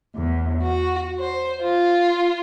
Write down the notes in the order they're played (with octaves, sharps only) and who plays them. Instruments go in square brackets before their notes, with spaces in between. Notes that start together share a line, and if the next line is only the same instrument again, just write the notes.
[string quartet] E2
F#4
C5
F4